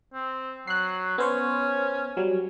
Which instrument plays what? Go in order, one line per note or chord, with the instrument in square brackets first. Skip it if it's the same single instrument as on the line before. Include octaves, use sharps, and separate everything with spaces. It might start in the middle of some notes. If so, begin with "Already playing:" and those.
[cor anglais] C4
[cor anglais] F#3 [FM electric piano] F#6 C7
[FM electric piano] B3 C5 C#5 [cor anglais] C#4
[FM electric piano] F#3 G3